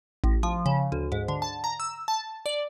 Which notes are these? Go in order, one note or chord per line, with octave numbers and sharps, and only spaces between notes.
A1
F3
C#3
D2
G#2
D3
A5
A#5
E6
A5
D5